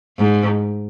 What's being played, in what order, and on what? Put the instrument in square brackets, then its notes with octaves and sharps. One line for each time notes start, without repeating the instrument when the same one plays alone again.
[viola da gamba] G#2